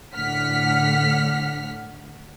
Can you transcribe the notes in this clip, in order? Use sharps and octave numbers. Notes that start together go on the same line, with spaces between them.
A2 D3 F#5 F6 B6